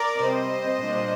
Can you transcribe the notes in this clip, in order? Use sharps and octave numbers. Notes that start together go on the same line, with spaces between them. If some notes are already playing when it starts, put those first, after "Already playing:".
Already playing: A#4 D5
C3 G3 C4 C5 D#5
A#2 G3 A#3 D4